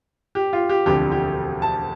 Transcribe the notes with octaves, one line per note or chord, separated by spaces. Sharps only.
G4
F4
G4
E1 D2 D3 F3 C4 G4
G4
A5